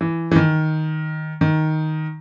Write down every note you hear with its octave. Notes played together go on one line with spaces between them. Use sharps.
E3
E3
D#3
D#3